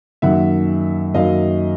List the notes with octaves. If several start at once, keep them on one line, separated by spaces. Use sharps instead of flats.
F#2 D#3 F#3 A#3 E5 F#5
F#2 D#3 F#3 A#3 D#5 F5